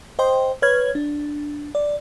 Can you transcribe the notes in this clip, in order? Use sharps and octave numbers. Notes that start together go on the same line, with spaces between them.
C5 D#5 G5 C6
B4 C#5 F6 G#6
D4
D5